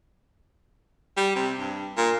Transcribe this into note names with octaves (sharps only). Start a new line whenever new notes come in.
G3
C3
G2
A#2